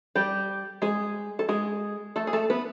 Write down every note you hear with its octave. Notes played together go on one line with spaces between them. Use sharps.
G3 G4
G#3 G#4
A4
G#3 G#4
A3 A4
G#4
A3 A4
B3 B4